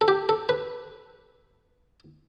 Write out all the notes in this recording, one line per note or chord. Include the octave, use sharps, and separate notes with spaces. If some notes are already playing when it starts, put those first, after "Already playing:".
A4
G4
A4
B4